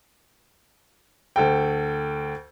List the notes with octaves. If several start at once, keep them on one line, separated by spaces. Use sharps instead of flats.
D2 A4 G5